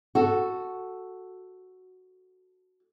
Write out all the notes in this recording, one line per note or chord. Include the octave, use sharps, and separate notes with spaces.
F#4 A4